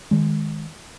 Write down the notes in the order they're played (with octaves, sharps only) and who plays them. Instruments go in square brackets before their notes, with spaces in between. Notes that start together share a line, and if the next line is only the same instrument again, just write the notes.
[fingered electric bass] D#3 G#3